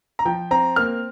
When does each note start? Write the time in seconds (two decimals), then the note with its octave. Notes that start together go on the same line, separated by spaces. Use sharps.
0.19 A#5
0.25 F3 G5
0.51 C4 A#5
0.76 A#3 F6